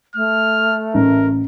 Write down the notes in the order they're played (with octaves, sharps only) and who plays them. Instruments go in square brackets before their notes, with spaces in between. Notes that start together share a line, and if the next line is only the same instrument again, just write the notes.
[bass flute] A3 [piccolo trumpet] F6
[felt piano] A1 [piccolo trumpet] A#4